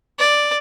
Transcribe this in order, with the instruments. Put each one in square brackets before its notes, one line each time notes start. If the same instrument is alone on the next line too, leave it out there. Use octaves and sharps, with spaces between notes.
[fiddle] D5